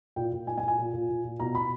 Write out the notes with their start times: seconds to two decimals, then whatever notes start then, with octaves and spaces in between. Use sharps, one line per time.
0.16 A#2 G5
0.32 A#2
0.47 A#2 G#5
0.58 G#5
0.63 A#2
0.68 G#5
0.78 A#2
0.93 A#2
1.09 A#2
1.24 A#2
1.40 B2 A#5
1.55 B2 B5